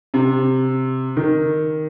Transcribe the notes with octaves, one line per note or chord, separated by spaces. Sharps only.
C3
D#3